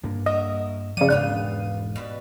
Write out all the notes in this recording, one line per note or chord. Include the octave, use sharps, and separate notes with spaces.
G2 A#3 D4
E4 F#4 A#4 D#5
C#3 F3 D5 F#5 D#7
E1 G#2 B3 D4 F5 G5
B2 G3 B4